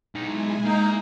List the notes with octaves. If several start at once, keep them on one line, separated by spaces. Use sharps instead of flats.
B1 G#3 D#4 E4 G#5
A#3 D#4